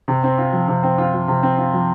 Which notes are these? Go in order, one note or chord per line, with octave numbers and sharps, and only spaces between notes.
C3
C4
F4
F3
C3
C4
F4
F3
C3
C4
F4
F3